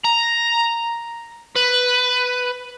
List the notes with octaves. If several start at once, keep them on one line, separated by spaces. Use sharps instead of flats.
A#5
B4